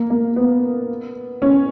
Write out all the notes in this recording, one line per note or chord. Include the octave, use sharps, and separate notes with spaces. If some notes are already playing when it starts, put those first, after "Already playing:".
Already playing: A#3
A#3
B3
C#4